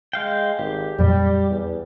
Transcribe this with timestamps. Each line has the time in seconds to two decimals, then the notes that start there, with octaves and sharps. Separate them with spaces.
0.13 G#3 F5 G5
0.59 G#1 G4
0.99 F2 A#2 F#3 G3
1.51 E2